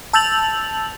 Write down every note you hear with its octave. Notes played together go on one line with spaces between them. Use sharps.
A5 E6 G6 A6 F7 F#7